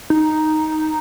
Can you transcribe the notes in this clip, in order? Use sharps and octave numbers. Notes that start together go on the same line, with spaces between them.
D#4